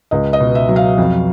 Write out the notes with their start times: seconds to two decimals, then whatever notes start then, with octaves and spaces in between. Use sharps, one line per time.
0.11 C#2 D#5
0.33 D#5
0.41 B2
0.55 E5
0.69 F#3
0.76 F5
0.98 F2